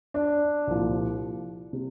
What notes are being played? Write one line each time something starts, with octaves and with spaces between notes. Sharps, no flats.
D4
C2 A#2 F3
C3